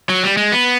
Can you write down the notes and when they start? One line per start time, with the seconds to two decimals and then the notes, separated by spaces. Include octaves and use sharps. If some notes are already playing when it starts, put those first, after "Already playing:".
0.09 F#3
0.23 G3
0.37 G#3
0.52 B3